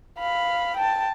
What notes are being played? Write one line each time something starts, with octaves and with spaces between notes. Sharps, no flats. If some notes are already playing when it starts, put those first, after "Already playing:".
F5 B5
G5 A5